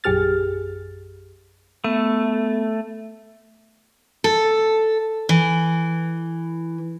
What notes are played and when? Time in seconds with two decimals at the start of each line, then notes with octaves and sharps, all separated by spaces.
0.04 A#1 F#2 G4 G#4 F6 A6
1.84 A3 B3
4.24 A4
5.29 E3